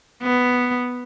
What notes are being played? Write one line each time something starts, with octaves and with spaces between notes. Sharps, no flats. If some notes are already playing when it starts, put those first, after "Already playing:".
B3